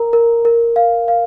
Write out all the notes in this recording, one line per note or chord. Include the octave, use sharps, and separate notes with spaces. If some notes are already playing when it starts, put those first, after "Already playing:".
Already playing: A#4 A#5
A#4
A#4
F5
F5